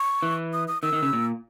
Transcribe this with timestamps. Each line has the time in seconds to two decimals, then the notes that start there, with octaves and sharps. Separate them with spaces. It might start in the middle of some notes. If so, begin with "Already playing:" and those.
Already playing: C#6
0.23 E3
0.53 D#6
0.68 D#6
0.82 D#3 E6
0.93 D#3
1.02 C#3
1.13 A#2